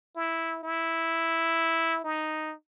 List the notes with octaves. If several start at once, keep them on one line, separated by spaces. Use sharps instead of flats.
E4
E4
D#4